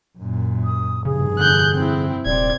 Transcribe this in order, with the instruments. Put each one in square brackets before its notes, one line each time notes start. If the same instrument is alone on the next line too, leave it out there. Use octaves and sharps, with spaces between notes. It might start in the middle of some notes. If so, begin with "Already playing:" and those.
[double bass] F#2 A#2
[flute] D#6
[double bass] F1 G2 [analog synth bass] C#3 [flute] G#4
[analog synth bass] D3 [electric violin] F#6 G6
[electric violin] C4 E4
[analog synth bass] D#1 [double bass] C3 C4 [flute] D5 [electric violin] G#6